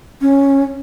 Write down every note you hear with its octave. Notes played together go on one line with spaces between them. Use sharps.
C#4